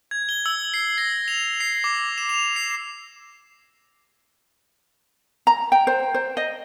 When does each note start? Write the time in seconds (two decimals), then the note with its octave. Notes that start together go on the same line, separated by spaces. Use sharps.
0.11 G#6
0.29 G7
0.46 E6
0.74 C7
0.98 A#6
1.28 F7
1.60 C7
1.84 D6
2.18 E7
2.29 F7
2.56 C7
5.47 A#5
5.72 G5
5.87 C5
6.14 C5
6.37 D#5